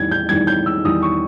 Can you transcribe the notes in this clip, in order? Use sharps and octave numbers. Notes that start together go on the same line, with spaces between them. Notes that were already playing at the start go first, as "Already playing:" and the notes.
Already playing: E2 D#3 G3 G#6
G6
E2 D#3 G3 G#6
G6
E6
E2 D#3 G3 D#6
C#6